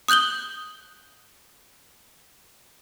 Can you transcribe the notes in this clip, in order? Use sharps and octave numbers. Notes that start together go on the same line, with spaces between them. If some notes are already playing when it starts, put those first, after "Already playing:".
D#6 F#6 G6 F#7 G7